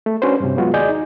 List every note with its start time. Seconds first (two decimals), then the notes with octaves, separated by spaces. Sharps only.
0.06 A3
0.22 C#4 D4 F#4 B4 C5
0.40 G2 C3
0.57 F#3 G#3 B3 F4 F#4
0.74 D#2 G#4 D5 D#5 G#5 G6
0.89 D#4